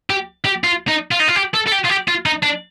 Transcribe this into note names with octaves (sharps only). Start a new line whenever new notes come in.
G4
G4
F4
D#4
F4
D#4
F4
G4
A4
A4
G4
F4
G4
F4
D#4
D4